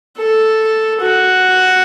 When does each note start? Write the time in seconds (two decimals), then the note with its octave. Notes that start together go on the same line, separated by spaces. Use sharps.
0.18 A4
1.01 F#4